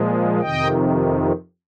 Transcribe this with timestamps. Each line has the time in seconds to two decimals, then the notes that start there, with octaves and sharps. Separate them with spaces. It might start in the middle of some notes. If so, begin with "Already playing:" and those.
Already playing: A#2 F3 G#3
0.40 F2 C3 D#3 D#5 G5